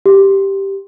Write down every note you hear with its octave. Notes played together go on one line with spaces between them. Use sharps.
G4